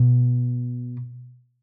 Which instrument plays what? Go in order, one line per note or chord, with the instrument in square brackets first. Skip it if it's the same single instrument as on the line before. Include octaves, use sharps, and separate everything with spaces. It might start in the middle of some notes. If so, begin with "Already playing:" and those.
Already playing: [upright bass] B2